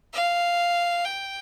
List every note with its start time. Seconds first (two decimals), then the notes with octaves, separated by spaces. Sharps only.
0.14 F5
1.05 G5